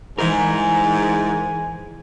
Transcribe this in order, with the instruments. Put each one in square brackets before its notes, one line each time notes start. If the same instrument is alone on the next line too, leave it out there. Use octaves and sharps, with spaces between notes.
[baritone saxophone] G#2 [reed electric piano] E3 G#4 [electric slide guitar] E4 A#4 [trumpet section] G#5